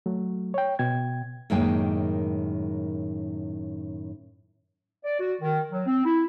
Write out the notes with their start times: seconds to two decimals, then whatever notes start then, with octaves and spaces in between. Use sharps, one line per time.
0.06 F#3 A3
0.54 C#5 G5
0.79 B2 G5 G#6
1.50 F#2 A2 D#3 G#3 A#3 G5
5.04 D5
5.20 F#4
5.41 D#3
5.71 F#3
5.86 C4
6.05 E4